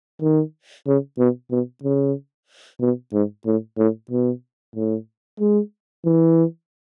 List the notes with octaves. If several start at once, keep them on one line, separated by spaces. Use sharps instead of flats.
D#3
C#3
B2
B2
C#3
B2
G#2
A2
A2
B2
A2
G#3
E3